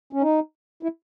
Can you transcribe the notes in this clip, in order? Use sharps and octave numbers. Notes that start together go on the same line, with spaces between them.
C#4
D#4
E4